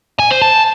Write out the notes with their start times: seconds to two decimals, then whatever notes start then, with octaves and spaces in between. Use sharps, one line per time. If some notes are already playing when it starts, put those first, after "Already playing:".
0.19 G#5
0.31 C5
0.42 A5